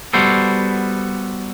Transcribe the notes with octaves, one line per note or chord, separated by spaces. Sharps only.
G3 B3 F#4 A4 C5